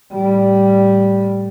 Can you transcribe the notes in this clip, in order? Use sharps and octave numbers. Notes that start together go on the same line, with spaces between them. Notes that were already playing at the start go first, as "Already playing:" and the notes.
A2 G3